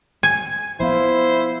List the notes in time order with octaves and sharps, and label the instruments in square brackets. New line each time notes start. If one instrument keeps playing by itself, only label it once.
[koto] G#5
[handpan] F3 B3 F5 [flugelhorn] E4 [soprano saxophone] C5